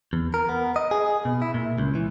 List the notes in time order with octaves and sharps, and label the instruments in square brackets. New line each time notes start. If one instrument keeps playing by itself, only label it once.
[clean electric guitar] E2
A#4
B3
D#5
G#4
B2
E4
A#2
C#2
E3